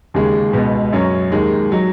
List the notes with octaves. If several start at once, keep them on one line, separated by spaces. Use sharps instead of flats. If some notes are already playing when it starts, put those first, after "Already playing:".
D#2 C#3 G#3
C#2 B2 B3
F#2 F#3 C#4
D#2 D#3 G#3 D#4
F#3 D#4